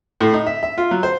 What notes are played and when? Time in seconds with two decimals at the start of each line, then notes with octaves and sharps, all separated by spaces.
0.21 A2
0.33 D#4
0.46 E5
0.63 E5
0.78 F4
0.91 F#3
1.03 C5